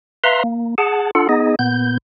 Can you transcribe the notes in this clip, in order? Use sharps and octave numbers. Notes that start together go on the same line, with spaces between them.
B4 E5 F5 A#5 C6
A#3
G#4 F#5 A5
D4 F4 A4 F#5
B3 D#4 G#4 D#5
A#2 B3 G6